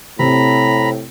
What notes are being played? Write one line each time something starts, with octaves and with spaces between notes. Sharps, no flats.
A2 C3 A#5 B5